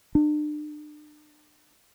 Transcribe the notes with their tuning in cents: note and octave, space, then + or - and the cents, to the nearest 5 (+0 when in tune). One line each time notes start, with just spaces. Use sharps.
D4 +40